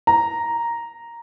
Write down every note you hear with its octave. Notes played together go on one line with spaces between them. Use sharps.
A#5